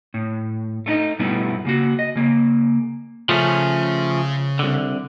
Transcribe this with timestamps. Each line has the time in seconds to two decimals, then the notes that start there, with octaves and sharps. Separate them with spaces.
0.14 A2
0.86 A3 D4 D#4 D#5
1.19 G2 B2 G3 A3 B3 E4
1.65 C#3 A#3 F#4
1.99 D#5
2.15 C#3 A#3
3.29 C#3 F3 A3 C#4 G#4
4.59 C2 D3